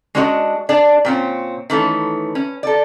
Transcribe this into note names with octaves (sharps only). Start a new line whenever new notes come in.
G#3 C#4 D4 F#4 C#5 D#5
D4 G#4 D5
A#2 C4 C#4
D#3 E3 A3 C#4
C#4
A4 D5